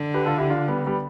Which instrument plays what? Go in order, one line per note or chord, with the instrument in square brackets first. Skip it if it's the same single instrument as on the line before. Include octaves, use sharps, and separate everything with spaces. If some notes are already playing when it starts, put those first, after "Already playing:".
Already playing: [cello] D3
[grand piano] G4 B4
F4 A4
E4 G4
D4 F4
G3 B3
G3 B3